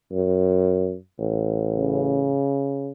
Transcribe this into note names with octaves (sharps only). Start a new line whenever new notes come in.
F#2
A1
C#3